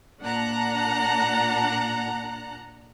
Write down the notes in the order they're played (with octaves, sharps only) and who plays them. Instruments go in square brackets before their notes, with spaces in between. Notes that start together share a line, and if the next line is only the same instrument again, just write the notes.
[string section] A#2 D4 F#5 A5 A#5 F#6